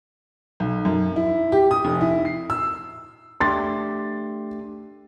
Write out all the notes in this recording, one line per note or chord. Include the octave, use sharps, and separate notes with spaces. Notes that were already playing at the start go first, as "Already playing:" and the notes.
B1
F#2
E4
G4
D#6
F1
E4
C7
E6
A3 D4 G4 C6 A6